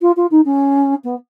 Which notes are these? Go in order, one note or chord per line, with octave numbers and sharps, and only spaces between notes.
F4
F4
D#4
C#4
B3